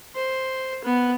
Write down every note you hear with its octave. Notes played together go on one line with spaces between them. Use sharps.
C5
B3